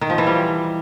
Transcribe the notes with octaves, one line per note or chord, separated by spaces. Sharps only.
D#3
F3
E3
G3